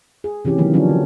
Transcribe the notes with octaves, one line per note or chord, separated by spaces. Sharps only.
G#4
C3 E3 C#4 G4
C3 D#3 E3 F#3 A#3
D3 F3 F#3 C#4 D4
D3